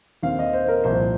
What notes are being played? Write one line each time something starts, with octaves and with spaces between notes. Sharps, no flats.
D#2 D#3 C4 F5
D#5
C5
A#4
C2 A#2 F3 C5